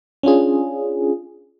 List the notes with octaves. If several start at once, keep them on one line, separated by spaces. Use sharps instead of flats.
C#4 D4 F4 G#4